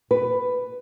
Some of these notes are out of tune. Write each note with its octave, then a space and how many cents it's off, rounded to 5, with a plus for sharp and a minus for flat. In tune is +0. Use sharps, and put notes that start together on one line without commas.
B4 +10